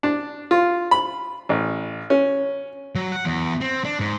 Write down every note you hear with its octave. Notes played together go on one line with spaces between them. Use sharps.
D4
F4
B5
A1
C#4
F#3
F#5
E2
C4
D4
G#2